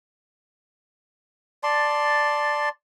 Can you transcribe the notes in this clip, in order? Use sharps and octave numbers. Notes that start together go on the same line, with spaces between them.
D5 A5 C6